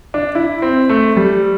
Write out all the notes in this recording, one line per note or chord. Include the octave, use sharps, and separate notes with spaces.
D4
E4
C4
A3
G3